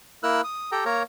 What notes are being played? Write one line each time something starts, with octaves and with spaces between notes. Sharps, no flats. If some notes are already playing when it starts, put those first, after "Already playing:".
A#3 E4 A#4 E6 F#6
D#6
G4 A4 G5 A#5
A#3 A#4 C#5 A#5